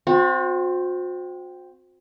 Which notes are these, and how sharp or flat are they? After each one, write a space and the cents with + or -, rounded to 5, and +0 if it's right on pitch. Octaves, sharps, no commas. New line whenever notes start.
C4 +0 F#4 -40